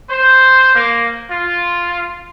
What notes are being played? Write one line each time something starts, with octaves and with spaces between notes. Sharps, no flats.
C5
A#3
F4